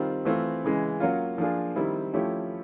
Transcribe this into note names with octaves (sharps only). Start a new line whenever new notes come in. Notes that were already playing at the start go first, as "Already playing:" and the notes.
Already playing: D#3 G3 C4 F4
E3 A3 C4 F4
C#3 E3 G#3
F#3 A#3 C#4 F4
F3 A#3 D4 F4 G#4
D#3 G3 C4 E4
F3 A3 C#4 E4 G4